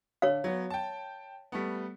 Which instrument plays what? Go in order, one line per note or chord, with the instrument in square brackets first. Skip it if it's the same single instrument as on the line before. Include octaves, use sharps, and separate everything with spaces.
[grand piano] D3 [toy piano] C#5 F5
[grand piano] F#3 B3
G5 A5
G3 A3 B3